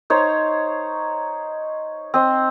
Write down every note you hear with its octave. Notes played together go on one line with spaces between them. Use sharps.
D#4 C5 C#5
C4 D#5